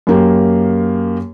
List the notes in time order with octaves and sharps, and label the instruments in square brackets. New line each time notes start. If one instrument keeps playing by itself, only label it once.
[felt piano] F#2 A#3 G4